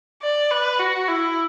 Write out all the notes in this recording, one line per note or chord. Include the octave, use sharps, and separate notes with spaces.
D5
B4
F#4
E4